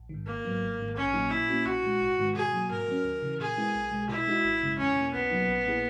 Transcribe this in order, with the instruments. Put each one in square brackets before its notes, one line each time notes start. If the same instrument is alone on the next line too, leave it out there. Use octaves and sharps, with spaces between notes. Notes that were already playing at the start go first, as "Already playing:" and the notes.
Already playing: [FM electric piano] A#1
G#2 D#3
[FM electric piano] G#1 [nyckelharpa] A#3
[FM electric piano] G#2 F#3 B3
G#1
G#2 D#3
[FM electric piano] A#1 [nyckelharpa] C#4
[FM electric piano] A#2 F#3 A#3 D#4
[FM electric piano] A#2 [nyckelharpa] E4
[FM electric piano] A#3 C#4 F#4
[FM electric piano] B1 [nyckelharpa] F#4
[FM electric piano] A#2 G#3
G#1
G#2 D#3 G#3 B3
[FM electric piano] B2 [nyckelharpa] G#4
[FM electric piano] F#3 A#3
[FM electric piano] G#2 [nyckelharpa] A#4
[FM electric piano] F#3 C#4
D#2
C#3 E3
[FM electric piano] A#2 [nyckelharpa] G#4
[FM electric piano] G#3 B3 E4
B1
B2 G#3
[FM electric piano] B2 [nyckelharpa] E4
[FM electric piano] G#3 D#4 F#4
G#1
F#2 C#3 G#3
[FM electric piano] E2 [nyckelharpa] C#4
[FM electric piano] B2 A#3
[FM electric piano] B1 [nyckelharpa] B3
[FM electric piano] B2 F#3 A#3 D#4
A#1
A#2 A#3 E4 G#4